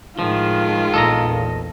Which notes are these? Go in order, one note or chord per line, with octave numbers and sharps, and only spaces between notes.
A2 D#3 F3 G#3 F4
A#1 E2 A#2 A4 D#5 A#5